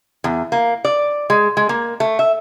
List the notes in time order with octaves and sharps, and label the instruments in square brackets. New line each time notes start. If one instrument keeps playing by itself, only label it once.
[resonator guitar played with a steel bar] E2
A#3
D5
G#3
G#3
A#3
A3
E5